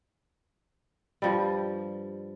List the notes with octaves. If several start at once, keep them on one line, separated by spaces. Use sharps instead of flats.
G2 F3 G3